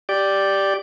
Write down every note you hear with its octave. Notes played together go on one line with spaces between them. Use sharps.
G4 D5